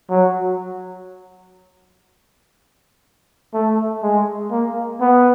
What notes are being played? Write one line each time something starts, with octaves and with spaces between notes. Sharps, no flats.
F#3
A3
G#3
A#3
B3